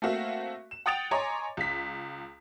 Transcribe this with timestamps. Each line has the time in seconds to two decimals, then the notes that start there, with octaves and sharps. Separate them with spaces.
0.02 A3 A#3 C4 F#4 E5 F5
0.71 E7
0.86 F#5 G5 D#6 A6 D7 F7
1.11 C#5 D#5 G#5 A#5 C6 D6
1.57 C#2 B6